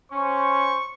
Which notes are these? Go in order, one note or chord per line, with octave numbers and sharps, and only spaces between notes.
C#4 C5 C#6